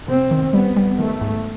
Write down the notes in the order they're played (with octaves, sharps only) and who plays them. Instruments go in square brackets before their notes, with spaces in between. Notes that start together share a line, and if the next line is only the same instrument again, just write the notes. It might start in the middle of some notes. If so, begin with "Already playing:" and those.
[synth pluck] C3 [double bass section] C4
[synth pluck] D#3
[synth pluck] G3 [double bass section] B3
[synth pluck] G3
[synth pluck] D#3 [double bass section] A3
[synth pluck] G#2